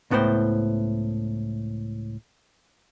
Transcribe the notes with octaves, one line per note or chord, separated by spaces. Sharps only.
C#2 A2 B3 E4 C5 G5